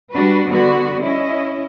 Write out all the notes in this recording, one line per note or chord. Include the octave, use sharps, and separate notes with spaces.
G3 D4 F#4 B4
D3 G3 B3 F#4 B4
C#4 E4 D#5